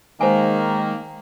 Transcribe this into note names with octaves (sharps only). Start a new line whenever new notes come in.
D#3 G#3 A#3 C5 G#5